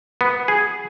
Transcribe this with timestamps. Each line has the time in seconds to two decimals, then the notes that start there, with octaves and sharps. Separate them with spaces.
0.21 B3
0.48 G#4